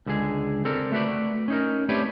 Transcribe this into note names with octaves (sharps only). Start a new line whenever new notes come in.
C#2 D3 G#3 G#4
C4 A4 A#4 D5
A3 F#4 B4 D5
C#4 D#4 A#4
A3 C4 G4 B4 C#5 D5